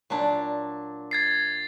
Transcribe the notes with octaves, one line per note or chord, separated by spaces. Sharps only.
A#2 F#3 D4
G#6 A6 C7